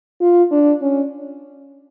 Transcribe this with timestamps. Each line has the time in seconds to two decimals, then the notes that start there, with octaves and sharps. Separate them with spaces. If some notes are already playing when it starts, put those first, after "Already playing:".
0.21 F4
0.51 D4
0.82 C#4